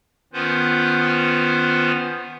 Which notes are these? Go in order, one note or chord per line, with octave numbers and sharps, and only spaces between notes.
D#3 B3 C#4 F4 B4 C5